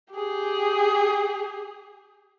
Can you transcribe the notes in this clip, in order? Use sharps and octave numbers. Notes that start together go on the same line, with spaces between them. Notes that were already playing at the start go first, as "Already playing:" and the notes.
G4 G#4